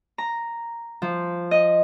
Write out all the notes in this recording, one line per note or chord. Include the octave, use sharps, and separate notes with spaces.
A#5
F3
D#5